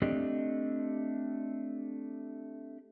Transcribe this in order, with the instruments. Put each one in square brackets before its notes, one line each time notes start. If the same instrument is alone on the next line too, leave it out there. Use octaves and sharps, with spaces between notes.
[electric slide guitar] A3 C4 D4 G4 D5 D#5